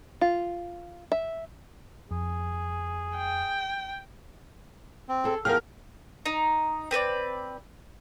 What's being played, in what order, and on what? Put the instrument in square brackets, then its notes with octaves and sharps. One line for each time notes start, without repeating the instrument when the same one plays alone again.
[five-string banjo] F4
E5
[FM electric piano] F2 [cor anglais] G#4
[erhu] G5
[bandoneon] C4
[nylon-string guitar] G#4 A4
[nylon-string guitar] E2 F3 G#4 [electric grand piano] A#4 F6 [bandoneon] F5 G5
[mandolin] D#4
C4 B4 C5 D5